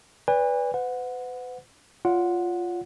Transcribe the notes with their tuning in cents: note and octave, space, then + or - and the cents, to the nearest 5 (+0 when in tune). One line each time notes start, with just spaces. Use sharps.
B4 +0 D5 -25 G#5 -45
B4 +40 F#5 -20
F4 +0 C#5 +40 F#5 -15